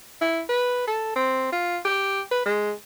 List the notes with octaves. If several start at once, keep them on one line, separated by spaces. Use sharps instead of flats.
E4
B4
A4
C4
F4
G4
B4
G#3